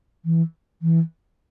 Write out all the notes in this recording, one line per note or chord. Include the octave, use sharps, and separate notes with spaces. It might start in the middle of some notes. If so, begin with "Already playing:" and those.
E3
E3